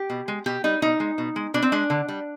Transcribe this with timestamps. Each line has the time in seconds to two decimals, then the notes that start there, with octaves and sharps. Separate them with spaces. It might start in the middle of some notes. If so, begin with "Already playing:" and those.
Already playing: G4
0.10 B2
0.28 G#3
0.46 B2 G4
0.64 G3 D#4
0.82 B2 D#4
1.00 G#3
1.18 B2
1.36 G#3
1.54 B2 D4
1.62 C4
1.72 G#3 D4
1.90 D3
2.08 G3